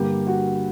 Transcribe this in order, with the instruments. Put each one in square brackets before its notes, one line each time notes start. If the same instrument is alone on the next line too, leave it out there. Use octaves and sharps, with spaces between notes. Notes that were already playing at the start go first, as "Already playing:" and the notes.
Already playing: [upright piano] G2 D3 A#3 G4
F#4